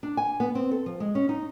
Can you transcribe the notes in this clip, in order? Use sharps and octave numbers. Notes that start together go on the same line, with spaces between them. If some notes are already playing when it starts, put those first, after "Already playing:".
D4
G#5
B3
C4
A4
F3
G#3
C#4
D#4